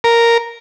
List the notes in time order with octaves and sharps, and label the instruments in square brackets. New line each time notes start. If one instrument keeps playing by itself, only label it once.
[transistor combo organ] A#4